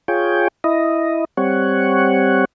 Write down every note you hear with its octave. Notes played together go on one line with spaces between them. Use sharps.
F4 G#4 C#5 G5
E4 D#5
G3 C4 C#5 F#5